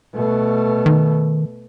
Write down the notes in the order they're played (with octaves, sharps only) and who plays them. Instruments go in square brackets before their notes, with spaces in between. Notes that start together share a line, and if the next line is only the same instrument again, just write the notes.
[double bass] B2 A3
[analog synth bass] D#3